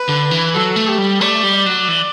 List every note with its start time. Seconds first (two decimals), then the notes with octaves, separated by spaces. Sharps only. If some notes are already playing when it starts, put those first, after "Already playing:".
Already playing: B4
0.09 D3
0.31 E3
0.54 F#3 A4
0.76 A3
0.87 G4
0.98 G3
1.20 A3 D5
1.43 G3
1.55 D5
1.66 F#3
1.88 E3